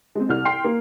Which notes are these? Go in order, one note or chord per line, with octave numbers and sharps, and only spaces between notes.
G#3 C4
C2 F6
G5 C6 C7
A#3